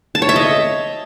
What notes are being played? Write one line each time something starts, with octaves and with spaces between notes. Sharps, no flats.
A5
C#5
E5
D#5